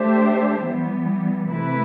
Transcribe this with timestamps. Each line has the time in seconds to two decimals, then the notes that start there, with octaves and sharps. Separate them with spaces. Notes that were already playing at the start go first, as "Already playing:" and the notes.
Already playing: A3 D4 G4 C5 E5
0.64 E3 G3 B3
1.48 C3 E3 A3 E4 B4